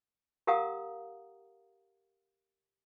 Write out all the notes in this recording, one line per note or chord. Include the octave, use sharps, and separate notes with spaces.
G4 A#4 F5 F#5 A#5 D#6